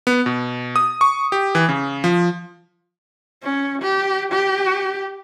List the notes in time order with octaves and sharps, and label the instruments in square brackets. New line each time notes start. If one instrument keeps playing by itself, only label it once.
[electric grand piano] B3
B2
D#6
C#6
G4
E3
C#3
F3
[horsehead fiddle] C#4
G4
G4